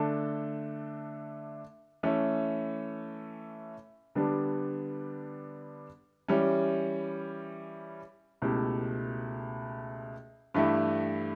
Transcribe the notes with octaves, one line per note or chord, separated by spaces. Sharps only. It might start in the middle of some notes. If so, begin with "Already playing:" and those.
Already playing: D3 A3 D4 A4
E3 A3 C#4
D3 G3 B3 D4
E3 G3 C#4
C#2 B2 A3 E4 G4
G2 E3 A3 E4 G4